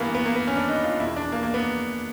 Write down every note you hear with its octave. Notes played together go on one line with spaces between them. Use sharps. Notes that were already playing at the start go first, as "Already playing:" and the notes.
Already playing: G2 E3 A#3 B3
B3
A#3
B3
C#4
D4
D#4
F4
E2 B2 E4
D4
A#3
A#3
B3